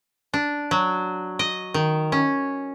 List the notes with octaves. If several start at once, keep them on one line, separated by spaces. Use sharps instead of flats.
D4
F#3
D#5
D#3
C#4